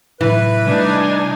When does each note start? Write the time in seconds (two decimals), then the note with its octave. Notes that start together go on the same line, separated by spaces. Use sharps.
0.21 A2 C3 E3 F#3 B4
0.67 C3 G3 A3 D4 D#4 G#5